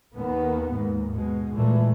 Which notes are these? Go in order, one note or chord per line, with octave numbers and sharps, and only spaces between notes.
D#2 D#3 A#3 B3
D#2 G#2
B2 G#3
A#2 E3 G#3 A3